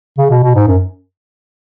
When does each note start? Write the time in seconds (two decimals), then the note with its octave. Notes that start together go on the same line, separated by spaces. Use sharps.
0.18 C#3
0.30 B2
0.43 B2
0.55 G#2
0.67 F#2